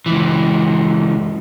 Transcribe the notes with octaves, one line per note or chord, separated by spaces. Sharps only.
C#2 E3